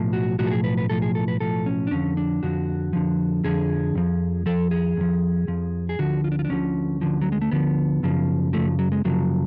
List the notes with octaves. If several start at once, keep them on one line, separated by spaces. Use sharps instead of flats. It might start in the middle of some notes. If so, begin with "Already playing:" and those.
Already playing: B1 A2 F3
F#4
B1 A2 F3 F#4
A4
G#4
B4
B4
B1 A2 F3 A4
G#4
A4
B4
B1 A2 F3 A4
C#4
D4
F2 D3 F3 C#4
D4
F2 D3 F3 F#4
F2 D3 F3
F2 D3 F3 G#4
F2 F3
F2 F3 A4
G#4
F2 F3
F2 F3
G#4
D2 D3 F3 F#4
F4
D4
F4
D4
D2 D3 F3 C#4
D2 D3 F3
F#3
G#3
A3
D2 D3 F3 B3
F#2 C#3 F3
F#2 C#3 F3 A3
F#3
G#3
F#2 C#3 F3 F#3